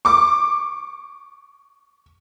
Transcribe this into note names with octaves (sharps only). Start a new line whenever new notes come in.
C#6 D6